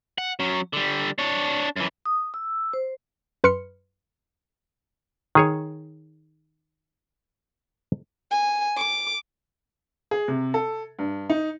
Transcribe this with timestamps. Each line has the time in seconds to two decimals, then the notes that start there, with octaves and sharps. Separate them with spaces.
0.18 F#5
0.40 F#3 C#4
0.73 D3 G3
1.18 D4 C#5
1.76 F#2 E3
2.06 D#6
2.34 E6
2.73 C5
3.44 F#2 B4 C6 F6 C#7
5.35 D#3 G#4 C#5
8.31 G#5
8.77 D6
10.11 G#4
10.28 C3
10.54 A4
10.99 G2
11.30 D#4